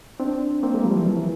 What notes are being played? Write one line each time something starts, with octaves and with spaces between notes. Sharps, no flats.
C4 D4
A#3 C4
G#3 A#3
F3 G3
E3 F#3
F3
E3